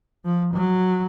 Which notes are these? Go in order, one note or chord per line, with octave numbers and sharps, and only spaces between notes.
F3
F#3